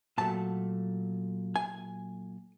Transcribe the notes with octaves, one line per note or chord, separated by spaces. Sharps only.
A#2 F#3 A3 A5
G#5